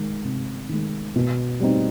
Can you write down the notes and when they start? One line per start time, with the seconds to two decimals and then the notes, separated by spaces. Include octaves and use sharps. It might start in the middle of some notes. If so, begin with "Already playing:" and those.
Already playing: D#3 G#3
0.25 C3
0.69 D#3 G#3
1.16 B2
1.60 G3 C4 D#4